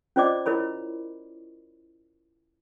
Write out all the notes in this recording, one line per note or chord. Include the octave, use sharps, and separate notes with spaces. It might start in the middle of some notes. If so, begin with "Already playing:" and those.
C#4 F4 C5 D5 D#5 D6
E4 A#4 C#5 B5